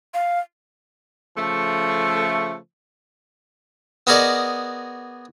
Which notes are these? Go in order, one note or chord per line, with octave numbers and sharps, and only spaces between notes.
F5
C#3 F3 A3
B3 F#4 G#4 A#4 D5 D#5